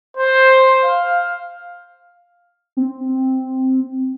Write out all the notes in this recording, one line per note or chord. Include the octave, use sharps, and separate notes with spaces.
C5
F5
C4